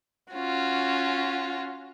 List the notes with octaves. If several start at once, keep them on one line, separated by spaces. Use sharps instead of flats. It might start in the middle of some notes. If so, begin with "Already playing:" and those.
C#4 F4 F#4